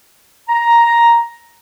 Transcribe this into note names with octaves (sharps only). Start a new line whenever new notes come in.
A#5